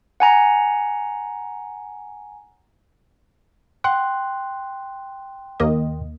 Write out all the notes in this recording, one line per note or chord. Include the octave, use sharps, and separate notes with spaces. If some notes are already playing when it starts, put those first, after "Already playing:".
F#5 G#5 A#5
F#5 G5 C6 F#6
D#2 A#3 D#5